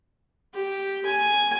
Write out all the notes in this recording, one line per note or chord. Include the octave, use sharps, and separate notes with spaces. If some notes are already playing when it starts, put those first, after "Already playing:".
G4
G#5